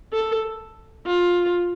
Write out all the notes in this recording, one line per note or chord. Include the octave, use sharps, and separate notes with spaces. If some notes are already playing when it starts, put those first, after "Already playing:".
A4
F4